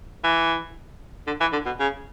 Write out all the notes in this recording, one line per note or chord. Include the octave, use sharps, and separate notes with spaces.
E3
D3
E3
D3
B2
C#3